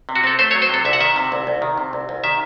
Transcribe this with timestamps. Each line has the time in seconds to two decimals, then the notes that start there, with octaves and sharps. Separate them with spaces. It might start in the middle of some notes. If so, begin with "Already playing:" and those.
0.09 C3
0.15 F#4
0.24 C4 A4
0.39 A3 C5
0.51 C#5
0.55 F#3
0.62 C5
0.69 C3 A4
0.85 C2 E5
0.93 F#5
1.00 D#3 E5
1.16 C3
1.32 C2
1.47 C2
1.62 D#3
1.78 C3
1.93 C2
2.09 C2
2.24 D#3 E5